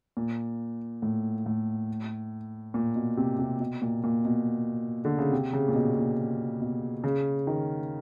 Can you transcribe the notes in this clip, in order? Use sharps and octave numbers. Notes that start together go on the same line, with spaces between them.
A#2
A2
A2
A#2
B2
C3
C3
B2
A#2
A#2
B2
D3
C#3
C3
C#3
A#2
B2
A#2
B2
C#3
D#3